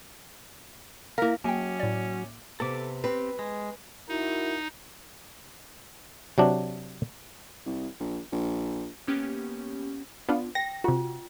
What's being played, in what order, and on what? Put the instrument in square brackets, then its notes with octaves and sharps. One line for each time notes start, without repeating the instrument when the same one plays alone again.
[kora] A#3 A#4 [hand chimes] E4 F5
[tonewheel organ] F#3 [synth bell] A#3 D6 [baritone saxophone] C#4 [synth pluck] G5 G#5
[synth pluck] A2 D5
[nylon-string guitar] C3 B3 [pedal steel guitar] A4 D6
[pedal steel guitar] C4 G4 [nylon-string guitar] B4
[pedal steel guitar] G#3
[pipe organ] D#4 [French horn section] E4 F#4 A#4
[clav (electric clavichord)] C3 F#3 D4
[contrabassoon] C2
A#1
A#1
[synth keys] A#3 B3 C#4 G4
[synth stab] B3 D4 F4
[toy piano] G5 [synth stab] A#6
[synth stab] C3 F#4 [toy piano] F4